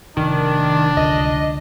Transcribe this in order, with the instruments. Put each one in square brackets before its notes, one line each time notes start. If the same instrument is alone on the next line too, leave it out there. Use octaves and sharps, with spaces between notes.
[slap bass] F1 [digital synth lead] D#3 [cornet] D4
[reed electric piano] C#2 D3 [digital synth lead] D#5